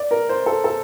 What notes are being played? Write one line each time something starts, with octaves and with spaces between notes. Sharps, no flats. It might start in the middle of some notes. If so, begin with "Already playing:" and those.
Already playing: D5
A#4
C5
A4
A4